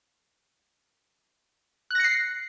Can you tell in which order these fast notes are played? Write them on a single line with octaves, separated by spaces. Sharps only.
F#6 A#6 C#7 C7